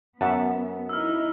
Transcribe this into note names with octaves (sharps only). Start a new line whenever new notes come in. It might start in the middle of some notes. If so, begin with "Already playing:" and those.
F#2 B3 E5 F#5 A5
D#4 E4 E6 F6